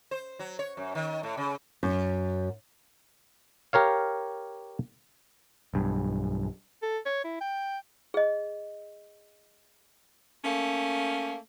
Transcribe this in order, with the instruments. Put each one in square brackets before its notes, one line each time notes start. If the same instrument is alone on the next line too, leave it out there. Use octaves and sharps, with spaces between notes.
[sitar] C5
F#3
C#5
F#2
D#3
A2
C#3
[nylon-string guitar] F#2
[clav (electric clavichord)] G4 A#4 C#5 F5
[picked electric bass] B1 G2
[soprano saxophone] A4
C#5
E4
G5
[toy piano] G#4 D#5
[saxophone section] A3 A#3 C#4